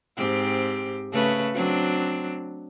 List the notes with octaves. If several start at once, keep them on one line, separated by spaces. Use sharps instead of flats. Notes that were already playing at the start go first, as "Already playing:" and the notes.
G#2 C4 G4
C#3 A3 B4
F#3 C4 D4